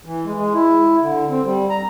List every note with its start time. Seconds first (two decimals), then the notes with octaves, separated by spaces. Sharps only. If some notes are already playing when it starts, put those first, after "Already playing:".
0.06 E3
0.25 G#3
0.36 G#3
0.53 E4
1.02 D3
1.30 C4
1.45 G3
1.70 A#5